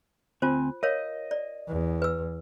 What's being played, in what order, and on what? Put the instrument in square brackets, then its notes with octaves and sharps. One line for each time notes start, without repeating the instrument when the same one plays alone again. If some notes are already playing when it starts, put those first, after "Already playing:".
[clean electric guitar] D2 C4 G#5 [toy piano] F4 C5
[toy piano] A#4 C#5 F5 [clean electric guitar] D#5
[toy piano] D5
[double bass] E2
[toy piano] B4 E6